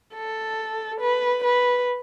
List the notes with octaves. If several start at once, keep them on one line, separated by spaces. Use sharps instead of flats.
A4
B4
B4